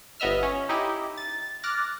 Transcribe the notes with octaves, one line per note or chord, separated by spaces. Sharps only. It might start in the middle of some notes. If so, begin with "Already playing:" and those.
G1 B3 D#5 E5 F6
C#4
D#4 E4 G4 D#5
A6
D6 F6 F#6 A6 A#6